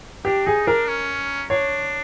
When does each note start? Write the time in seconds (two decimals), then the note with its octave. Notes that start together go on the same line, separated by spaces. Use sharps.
0.25 D4 G4
0.46 D#4 G#4
0.67 D4 A#4
0.88 C#4
1.50 D4 C#5